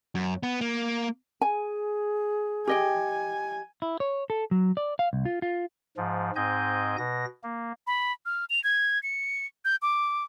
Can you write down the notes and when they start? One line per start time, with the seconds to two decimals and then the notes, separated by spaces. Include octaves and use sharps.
0.15 F#2
0.43 B3
0.61 A#3
1.41 G#4 G#5
2.67 G4 D#5 G5 G#5
3.82 E4
4.00 C#5
4.30 A4
4.51 F#3
4.77 D5
4.99 F5
5.13 C2
5.25 F4
5.42 F4
5.97 G#2 F3
6.36 G#2 C4 D#5 G#5 G6
6.98 B2 A#6
7.43 A#3
7.87 B5
8.26 F6
8.50 F7
8.64 G#6
9.03 C#7
9.65 G6
9.82 D6